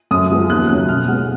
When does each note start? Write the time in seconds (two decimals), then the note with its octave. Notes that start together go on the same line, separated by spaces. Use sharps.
0.11 F#2 D#6
0.30 F3 G#3 B3
0.50 D#2 F#6
0.69 C#3 F#3
0.89 B2 F6
1.08 G#3 B3 F#5